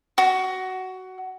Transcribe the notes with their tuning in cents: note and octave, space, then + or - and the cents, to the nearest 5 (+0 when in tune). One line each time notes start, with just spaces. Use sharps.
F#4 +15